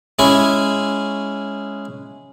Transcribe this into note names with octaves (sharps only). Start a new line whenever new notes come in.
G#3 C#4 E4 G#5